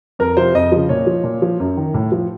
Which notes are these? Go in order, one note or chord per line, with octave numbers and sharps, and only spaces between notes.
F2 A#4
C3 F3 C5
F2 D#5
C#3 F3
A#2 C#5
F3
A#2
F3
F#2
D#3
A2
F3